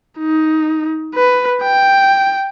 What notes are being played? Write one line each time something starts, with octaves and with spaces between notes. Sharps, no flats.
D#4
B4
G5